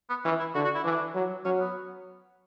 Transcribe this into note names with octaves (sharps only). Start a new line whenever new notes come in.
B3
E3 C#4
E4
D3 F#4
F#4
E4
E3 D4
F#3
F#3 C#4
B3